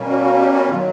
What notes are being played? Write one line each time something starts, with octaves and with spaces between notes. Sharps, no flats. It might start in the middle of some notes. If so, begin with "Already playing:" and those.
Already playing: B2 G3 A#3 C#4
F#4
F#4
G4
F#4
D#3 F#3 F4